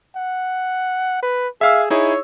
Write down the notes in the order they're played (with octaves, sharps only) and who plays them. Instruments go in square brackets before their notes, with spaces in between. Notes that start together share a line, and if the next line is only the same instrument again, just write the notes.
[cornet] F#5
B4
[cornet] G#4 [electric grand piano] E5 F5 E6
[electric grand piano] D#4 E4 G#4 [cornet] C#5